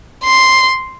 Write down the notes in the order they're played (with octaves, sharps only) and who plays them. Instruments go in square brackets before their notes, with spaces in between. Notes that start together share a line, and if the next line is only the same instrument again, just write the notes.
[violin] C6